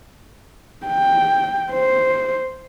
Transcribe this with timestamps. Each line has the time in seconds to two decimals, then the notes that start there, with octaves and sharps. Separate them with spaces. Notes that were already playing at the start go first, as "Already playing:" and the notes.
0.87 G5
1.72 C5